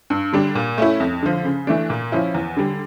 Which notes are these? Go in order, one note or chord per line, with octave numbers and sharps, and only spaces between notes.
G2
D3 G3 D4
A#2
A3 C#4 E4
F2
D3 F3
C#3
E3 A3 D4
A#2
F3 C#4 E4
E2
D3 G3